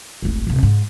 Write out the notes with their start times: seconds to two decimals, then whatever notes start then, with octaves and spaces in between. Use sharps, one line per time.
0.22 D1 G#1
0.47 D#1 C3
0.63 G#2